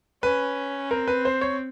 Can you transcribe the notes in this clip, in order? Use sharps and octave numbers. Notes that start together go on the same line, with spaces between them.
C#4 B4
C4 A#4
B4
C5
C#5